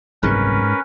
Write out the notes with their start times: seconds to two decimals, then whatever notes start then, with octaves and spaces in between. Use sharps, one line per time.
0.23 F#1 C2 G#2 B2 C#4 A#4 B4